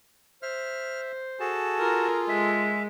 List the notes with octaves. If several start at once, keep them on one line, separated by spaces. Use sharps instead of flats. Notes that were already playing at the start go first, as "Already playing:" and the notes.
C5 E5 F6
F#4 G#4 A4 A5
F4 A#4
G#3 E5